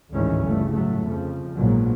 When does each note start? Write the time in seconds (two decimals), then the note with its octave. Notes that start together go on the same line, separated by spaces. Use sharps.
0.13 A1 D2 G#2 D#3 E3 C#4
0.43 G1 G2 C#3 A3
0.73 A2 F#3 A3
1.06 F2 C#3 F3
1.55 A#1 G#2 B2 F#3